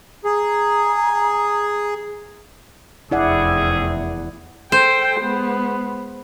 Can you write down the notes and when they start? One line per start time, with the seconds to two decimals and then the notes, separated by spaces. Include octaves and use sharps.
0.25 G#4 A#5
3.11 F1 E2 A3 C4 E4 G#4 D5 F#5
4.72 A4 C5 G5
5.19 G#3 B3